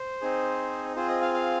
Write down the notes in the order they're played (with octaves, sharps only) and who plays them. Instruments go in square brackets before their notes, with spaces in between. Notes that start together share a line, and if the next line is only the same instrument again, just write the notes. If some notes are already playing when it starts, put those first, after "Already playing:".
Already playing: [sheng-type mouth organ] C5
C4 D#4 G#4
C4 F4 G#4 C5
D#5
F5
F5